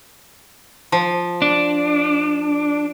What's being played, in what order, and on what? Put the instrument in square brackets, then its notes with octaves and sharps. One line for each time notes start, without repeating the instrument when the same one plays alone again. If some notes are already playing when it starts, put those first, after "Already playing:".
[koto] F3
[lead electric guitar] D4